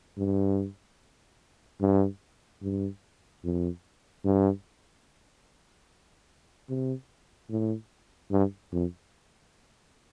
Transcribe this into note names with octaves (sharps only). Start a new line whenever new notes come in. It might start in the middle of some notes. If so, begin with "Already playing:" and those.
G2
G2
G2
F2
G2
C3
A2
G2
F2